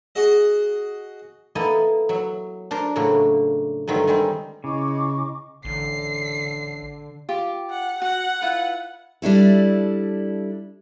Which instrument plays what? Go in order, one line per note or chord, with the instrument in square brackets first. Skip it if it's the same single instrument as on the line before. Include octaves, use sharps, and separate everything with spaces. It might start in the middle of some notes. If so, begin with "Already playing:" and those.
[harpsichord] F#4 G#4 D#5
[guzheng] A#3 B3 E4 A4 D#5
F#3 E5
D4 A#4 C5
A2 C#3 F#3 A#3 D4 F#4
G2 D3 D#3 F#3 A3
D#3 G3 G#3 C4
[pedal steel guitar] C#3 [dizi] E4 [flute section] D#5 C#6 D6
[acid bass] A1 [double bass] D3 [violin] C7
[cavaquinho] F4 G4 D6
[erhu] F#5
[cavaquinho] F#4 [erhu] F#5
[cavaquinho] E4 F4 B4
[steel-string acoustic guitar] G3 D4 E4 A4